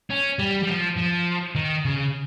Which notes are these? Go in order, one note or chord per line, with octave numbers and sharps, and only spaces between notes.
C#4
G3
G3
F3
F3
D#3
C#3